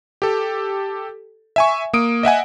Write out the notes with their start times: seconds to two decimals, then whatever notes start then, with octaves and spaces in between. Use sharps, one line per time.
0.22 G4 A4
1.56 E5 G#5 C#6
1.93 A#3 D#6 D7
2.23 D#5 E5 F#5 G#5